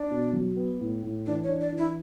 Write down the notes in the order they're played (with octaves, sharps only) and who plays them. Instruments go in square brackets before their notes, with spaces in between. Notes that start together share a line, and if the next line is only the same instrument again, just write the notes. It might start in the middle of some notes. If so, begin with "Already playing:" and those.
Already playing: [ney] D4
[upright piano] B2
F#3
B3
A2
A2
[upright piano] E3 [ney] D4
[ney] C#5
[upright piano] D4
[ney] D5
[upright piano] E3
[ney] E4